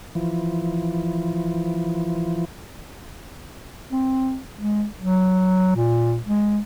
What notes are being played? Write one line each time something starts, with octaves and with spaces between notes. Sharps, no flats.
E3 F3
C4
G#3
F#3
A#2
G#3